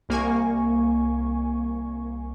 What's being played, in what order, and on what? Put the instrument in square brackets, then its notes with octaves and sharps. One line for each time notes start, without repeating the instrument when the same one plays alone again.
[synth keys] C2 A#3 G#5 C#6